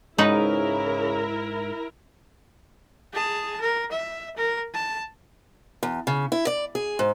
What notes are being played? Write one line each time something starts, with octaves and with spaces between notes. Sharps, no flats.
G#2 C#3 D#4 E4 F#4 A#4 B4
G#4 A5
A#4
E5
A#4
A5
E2
C#3
E4
D5
G#4
G#2